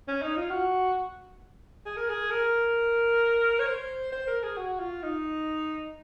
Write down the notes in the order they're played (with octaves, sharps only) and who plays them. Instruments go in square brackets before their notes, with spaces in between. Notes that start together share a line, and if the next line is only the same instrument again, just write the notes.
[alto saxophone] C#4
D#4
F4
F#4
G#4
A#4
G#4
A#4
C#5
C5
C5
A#4
G#4
F#4
F4
D#4